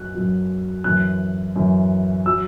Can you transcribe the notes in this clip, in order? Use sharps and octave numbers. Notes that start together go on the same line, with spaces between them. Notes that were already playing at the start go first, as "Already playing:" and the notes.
Already playing: F#2 F#3 F#6
F#2 F#3
F#2 E3 F#6
F#2 E3
F#3 E6